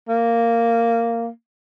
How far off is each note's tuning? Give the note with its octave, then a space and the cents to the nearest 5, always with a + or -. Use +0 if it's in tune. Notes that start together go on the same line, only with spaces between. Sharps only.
A#3 -10